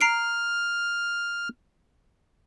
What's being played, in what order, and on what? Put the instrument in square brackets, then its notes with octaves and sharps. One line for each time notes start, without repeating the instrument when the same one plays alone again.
[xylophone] A#5 C7 D7 [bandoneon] F6